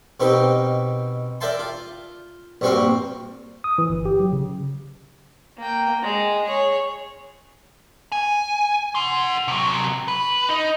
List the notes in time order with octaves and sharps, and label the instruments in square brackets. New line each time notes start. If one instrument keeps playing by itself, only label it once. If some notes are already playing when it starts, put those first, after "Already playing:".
[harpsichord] B2 C4 D#4 G4 A#4
A#4 D5 E5 G5 A5 C6
F4
A#1 G2 C4 F#4 A#4 C5
[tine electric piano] D#6
E3
G1
G4
F#3
C#3
[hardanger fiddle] A#3 G5
G#3
G#4 C#5
[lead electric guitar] G#5
F#5 C6
C3 F#3
B4
D#4